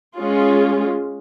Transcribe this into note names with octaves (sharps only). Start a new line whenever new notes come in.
G#3 C#4 F4 G#4